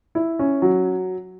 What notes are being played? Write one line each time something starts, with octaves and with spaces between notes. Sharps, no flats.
E4
C#4
F#3